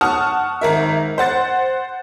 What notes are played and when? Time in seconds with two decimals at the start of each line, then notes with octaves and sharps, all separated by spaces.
0.01 F#5 A5 C#6 D#6 F6
0.61 G#1 A#4 E5
1.18 C5 F#5 A6